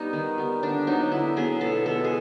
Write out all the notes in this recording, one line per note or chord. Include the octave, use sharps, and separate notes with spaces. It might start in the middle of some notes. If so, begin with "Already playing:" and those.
Already playing: G3 B3 D#4
D#3
G3 B3
D3 D4
F#3 B3 D#4
D3 E4
F#3 B3 G#4
B2 A4
G#3 B3 A4
G#4